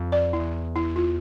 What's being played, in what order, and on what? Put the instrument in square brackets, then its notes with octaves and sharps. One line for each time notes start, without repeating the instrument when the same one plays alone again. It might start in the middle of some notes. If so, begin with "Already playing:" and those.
Already playing: [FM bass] F2
[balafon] D5
[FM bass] E2 [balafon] E4
[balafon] E4
F4